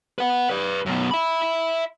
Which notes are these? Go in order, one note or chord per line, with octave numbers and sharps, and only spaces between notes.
B4 F#5
B4 D5
F#2 B2
E5 B5